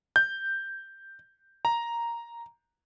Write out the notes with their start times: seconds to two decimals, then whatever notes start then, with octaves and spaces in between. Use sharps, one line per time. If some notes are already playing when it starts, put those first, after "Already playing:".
0.16 G6
1.65 A#5